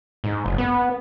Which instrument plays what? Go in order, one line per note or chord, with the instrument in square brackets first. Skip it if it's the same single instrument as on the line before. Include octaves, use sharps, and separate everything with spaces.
[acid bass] G#2
F#1
B3